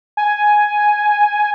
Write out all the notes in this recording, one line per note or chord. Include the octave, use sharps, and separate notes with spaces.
G#5